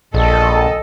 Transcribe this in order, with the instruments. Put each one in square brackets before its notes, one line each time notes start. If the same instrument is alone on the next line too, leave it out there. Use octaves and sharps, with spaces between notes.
[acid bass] A#1 [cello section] A4 D#5